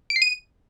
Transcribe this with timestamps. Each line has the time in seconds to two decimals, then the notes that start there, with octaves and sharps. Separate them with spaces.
0.10 D7
0.16 C7
0.22 D#7